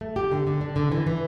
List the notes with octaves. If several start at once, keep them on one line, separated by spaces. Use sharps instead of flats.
A3
G4
D3
D3
D4
D3
E3
E3